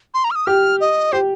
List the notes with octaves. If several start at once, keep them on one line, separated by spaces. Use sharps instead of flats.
C6
A#5
F6
D#6
G4 F6
D#5
G4 C5